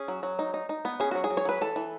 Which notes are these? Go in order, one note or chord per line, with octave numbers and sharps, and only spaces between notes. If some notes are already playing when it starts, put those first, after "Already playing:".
Already playing: C#4 G#4
F#3
F#3
D#4
D#4
D#4
B3
C#4 G#4
F#3 F#4
G#4
F#3
C#5
F#3 B4
E3 A4
E3